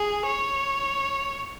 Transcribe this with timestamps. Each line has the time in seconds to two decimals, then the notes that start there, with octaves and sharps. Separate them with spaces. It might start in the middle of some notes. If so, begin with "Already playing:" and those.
Already playing: G#4
0.26 C#5